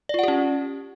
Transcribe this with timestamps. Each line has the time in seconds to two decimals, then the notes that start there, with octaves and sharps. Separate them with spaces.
0.09 D5
0.14 F4
0.19 F#5
0.23 G4
0.28 C#4